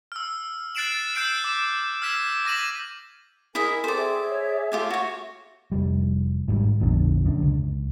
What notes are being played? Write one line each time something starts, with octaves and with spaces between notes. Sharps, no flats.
E6 F6
F#6 A6 C7 D7 E7 F#7
E6 F#6 G6 C7 D7 E7
D6
E6 F6 G#6 B6 E7
D6 A#6 D#7 F#7
E4 G#4 A#4 D#5 E5 G#5
C4 G4 A4 C5 D5
G#4 E5
C#5
A3 F4 G4 G#5
F#4 C#5 E5
F1 G3
G#1 G#2 B2 G3
A#1 F2 B2 D3
F#2 D3
C#2